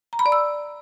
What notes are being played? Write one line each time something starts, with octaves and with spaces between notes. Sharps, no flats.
A#5
B5
D5
E6